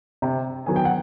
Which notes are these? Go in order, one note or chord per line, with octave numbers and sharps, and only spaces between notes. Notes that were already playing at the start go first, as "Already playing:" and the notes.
C3
D#3 F#3 B3 G#5
G5
F#5